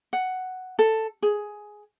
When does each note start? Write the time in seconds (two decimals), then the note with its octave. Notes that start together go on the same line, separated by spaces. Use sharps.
0.13 F#5
0.79 A4
1.22 G#4